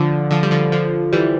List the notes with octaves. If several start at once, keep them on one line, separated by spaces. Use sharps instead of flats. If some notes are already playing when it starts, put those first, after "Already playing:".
Already playing: D3 F3
D3 F3
G3
D3 F3
D3 F3
E3 G3